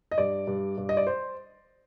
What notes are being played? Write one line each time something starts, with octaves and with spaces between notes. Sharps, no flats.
D#5
G2 D5
G2
G2
D#5
D5
C5